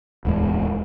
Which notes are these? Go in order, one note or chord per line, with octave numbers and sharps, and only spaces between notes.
D1 E2 G#3